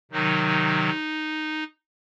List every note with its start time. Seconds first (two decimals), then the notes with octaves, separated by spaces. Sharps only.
0.11 C3 D#3 F#3 D#4